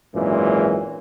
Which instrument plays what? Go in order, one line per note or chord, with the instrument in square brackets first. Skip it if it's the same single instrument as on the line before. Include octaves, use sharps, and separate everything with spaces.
[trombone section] G#1 F#2 A#2 E3 G#3